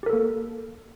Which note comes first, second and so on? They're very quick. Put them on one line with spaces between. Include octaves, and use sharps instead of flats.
G4 A#4 A4 A#3